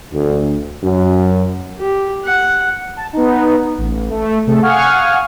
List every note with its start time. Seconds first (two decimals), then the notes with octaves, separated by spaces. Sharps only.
0.12 D2
0.83 F#2
1.79 G4
2.25 F#5
2.97 A5
3.13 B3 D#4
3.78 A1
4.10 A3
4.47 C3 A3 G#4 A4
4.62 F5 F#5 G#5 C#6 D#6 F6